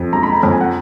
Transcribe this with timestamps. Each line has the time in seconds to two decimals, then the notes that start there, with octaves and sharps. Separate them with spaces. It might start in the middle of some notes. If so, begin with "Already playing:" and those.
Already playing: F2
0.13 G#3 A#5
0.23 B5
0.33 A#5
0.43 F2 A#5
0.52 G#5
0.61 F#5